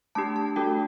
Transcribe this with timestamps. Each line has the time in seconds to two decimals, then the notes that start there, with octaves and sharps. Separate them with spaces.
0.15 A3 D4 G4 A5
0.36 A5
0.56 A3 D4 F#4 A4 G5